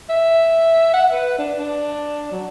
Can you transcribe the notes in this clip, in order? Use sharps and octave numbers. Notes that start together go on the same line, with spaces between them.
E5
F#5
B4
D4
D4
F#3